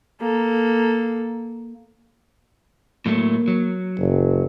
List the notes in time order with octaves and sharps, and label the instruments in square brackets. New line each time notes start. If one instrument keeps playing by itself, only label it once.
[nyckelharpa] A#3 A4
[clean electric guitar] A2 F#3 A3 [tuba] A#3
[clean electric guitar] F#3
[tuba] F#1